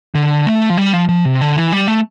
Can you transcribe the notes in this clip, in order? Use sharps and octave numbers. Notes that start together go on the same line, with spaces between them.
D3
A3
F3
G3
F3
F3
C3
D3
E3
G3
A3